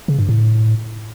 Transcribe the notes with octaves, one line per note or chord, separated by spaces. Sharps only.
C#3
G2
A2